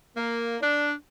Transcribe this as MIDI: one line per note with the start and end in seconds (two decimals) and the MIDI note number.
0.17 0.57 58
0.61 0.92 62